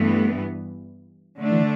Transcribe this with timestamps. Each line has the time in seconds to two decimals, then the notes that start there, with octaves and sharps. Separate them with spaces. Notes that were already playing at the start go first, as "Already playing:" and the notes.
Already playing: G2 E3 A3 B3
1.38 D3 A3 D4
1.51 E3